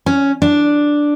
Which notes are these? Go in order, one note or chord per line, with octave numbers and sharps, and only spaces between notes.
C#4
D4